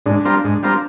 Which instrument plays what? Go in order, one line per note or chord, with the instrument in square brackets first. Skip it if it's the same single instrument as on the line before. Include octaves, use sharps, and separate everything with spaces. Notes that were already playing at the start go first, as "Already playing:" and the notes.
[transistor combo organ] G#2 [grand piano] D4
[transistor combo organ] G3 C4 F4 A#4
G#2
G3 C4 F4 A#4